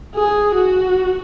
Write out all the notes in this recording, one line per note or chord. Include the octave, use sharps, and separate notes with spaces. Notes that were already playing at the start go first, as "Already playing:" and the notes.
G#4
F#4